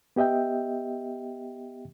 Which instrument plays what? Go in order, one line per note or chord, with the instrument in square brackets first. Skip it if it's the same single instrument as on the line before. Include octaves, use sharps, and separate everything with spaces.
[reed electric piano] B3 G4 D#5 E5 G5